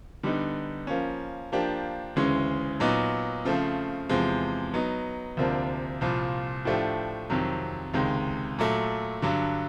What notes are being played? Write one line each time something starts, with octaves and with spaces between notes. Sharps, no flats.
D3 G3 B3 D#4
F3 A#3 C#4
F3 A#3 D4 G4
D2 C#3 E3 G#3 C#4
A#2 F#3 B3 D#4
C#3 F3 A3 C4
E2 C3 F3 G#3
F#3 B3 D#4
D2 C3 F3 A#3 D4
C2 A#2 F3
A2 F3 A3 D4 G4
F2 C3 D#3 F#3
C#2 C3 D#3 G#3
A#2 F#3 A3
G2 D3 F#3